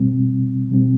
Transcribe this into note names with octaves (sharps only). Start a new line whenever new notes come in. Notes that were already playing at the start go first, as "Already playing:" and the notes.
Already playing: B2 G3 C4
B2 G3 C4